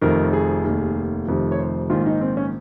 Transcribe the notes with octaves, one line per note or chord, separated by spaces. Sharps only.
F1 F2 D#3 A#4
G#4
F1 D#2 D#3
F1 F2 C3 D#3
C#5
C5
A#1 G#2 D#3 F4
D#4
C4
C#4